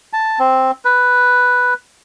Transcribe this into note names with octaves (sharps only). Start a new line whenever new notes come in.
A5
C4
B4